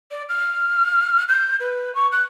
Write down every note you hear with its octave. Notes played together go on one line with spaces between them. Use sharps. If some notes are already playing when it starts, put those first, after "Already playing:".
D5
F6
G6
B4
C#6
F#6